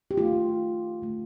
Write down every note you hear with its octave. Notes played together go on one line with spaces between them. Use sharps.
G4
D#3 A3 F4
D3 A3